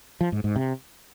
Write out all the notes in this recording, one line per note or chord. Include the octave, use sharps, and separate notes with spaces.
F3
G#2
G#2
C3